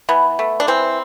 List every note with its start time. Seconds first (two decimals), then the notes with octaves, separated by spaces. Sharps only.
0.09 E3 B3
0.39 A3
0.60 D4
0.67 E3 C4